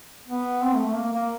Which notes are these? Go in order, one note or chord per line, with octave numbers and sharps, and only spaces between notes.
B3
C4
A3
A3
A#3
A#3